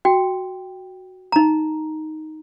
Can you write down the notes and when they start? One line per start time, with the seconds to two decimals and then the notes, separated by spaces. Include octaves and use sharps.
0.05 F#4 G5
1.32 D#4 A#5